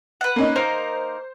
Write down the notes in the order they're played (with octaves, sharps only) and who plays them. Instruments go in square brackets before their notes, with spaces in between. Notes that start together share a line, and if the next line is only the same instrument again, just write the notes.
[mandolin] B4 F#5
[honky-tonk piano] A#3 C#4 D#4
[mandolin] A#3 D#4 A#4 [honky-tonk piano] C5